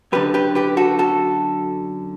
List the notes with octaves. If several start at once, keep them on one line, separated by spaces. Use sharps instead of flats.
F#2 D3 G4 B4
G4 B4
G4 B4
F#4 A4
F#4 A4